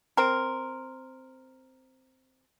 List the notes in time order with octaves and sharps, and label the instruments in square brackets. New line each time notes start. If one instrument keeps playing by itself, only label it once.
[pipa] C4 A#4